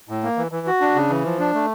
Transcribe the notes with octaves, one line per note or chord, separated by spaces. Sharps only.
A2
A#3
E3
E3
F#4
D4
C#3
E3
F3
D4
A3